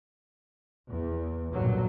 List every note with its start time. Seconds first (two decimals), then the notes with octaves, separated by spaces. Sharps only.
0.90 E2
1.53 B1 G2 A#2 D3 F#3